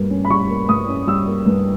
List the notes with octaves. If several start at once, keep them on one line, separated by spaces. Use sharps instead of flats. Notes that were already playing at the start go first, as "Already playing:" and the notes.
Already playing: G2 G3 A#3
C#4
B5
G3 C#6
A#3
G2 D#6
C#4
G3 E6
A#3
G2